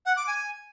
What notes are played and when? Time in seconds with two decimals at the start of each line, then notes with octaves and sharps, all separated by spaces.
0.06 F#5
0.16 D6
0.27 G#5